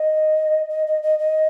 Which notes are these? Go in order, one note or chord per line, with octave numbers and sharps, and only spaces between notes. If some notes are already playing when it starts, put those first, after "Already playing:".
Already playing: D#5
D#5
D#5
D#5
D#5